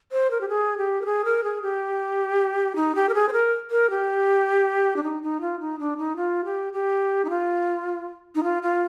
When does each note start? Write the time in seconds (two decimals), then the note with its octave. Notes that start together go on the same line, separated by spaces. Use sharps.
0.12 C5
0.31 A#4
0.41 G4
0.49 G#4
0.78 G4
1.02 A#4
1.06 G#4
1.25 A#4
1.44 G#4
1.62 G4
2.76 D#4
2.95 G4
3.09 A#4
3.14 G#4
3.29 C5
3.33 A#4
3.71 A#4
3.90 G4
4.96 D4
5.03 D#4
5.23 D#4
5.41 F4
5.60 D#4
5.79 D4
5.98 D#4
6.16 F4
6.45 G4
6.73 G4
7.25 D#4
7.30 F4
8.35 D#4
8.43 F4
8.63 F4